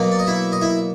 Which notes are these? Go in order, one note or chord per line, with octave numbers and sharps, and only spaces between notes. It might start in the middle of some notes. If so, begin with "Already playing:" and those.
Already playing: B2 F#3 A#3
D5
D#5
E4 E5
D#5
E4 E5